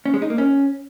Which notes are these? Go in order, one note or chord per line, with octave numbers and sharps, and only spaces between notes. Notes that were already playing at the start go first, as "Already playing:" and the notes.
C#4
G#3
D#4
A#3
C#4